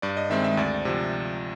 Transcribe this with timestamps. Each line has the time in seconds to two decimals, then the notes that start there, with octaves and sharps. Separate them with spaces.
0.02 G2 D5
0.17 D#5
0.30 D#3 G#3 C4 E5
0.44 E5
0.57 D2 D5
0.85 C3 F3